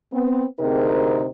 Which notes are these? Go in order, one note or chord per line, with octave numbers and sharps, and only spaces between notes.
B3 C4
D2 C3 C4 D#4 G#4 A#4